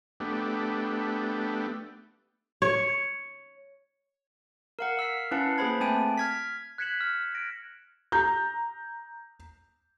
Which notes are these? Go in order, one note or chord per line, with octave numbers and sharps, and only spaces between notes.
A3 B3 D4 G4
C#5
A#4 F5 F#5
F5 E6 F6 B6
C#4 E4 B4 F5 F#5 A5
A#3 G#4 B4 C5 B5 G#6
A3 C4 G#5 A5 D7
F6 G#6 B6
F#6 G#6 B6 C#7 E7 F#7
F6
A#6 D7
A#5 G6